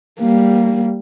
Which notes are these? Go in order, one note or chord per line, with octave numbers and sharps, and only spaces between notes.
G3 A#3